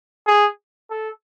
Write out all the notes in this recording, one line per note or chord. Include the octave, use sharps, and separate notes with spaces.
G#4
A4